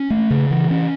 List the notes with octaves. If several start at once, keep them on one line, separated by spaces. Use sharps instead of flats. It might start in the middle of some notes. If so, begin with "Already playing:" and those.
Already playing: C#4
A3
C#3
E3
C#4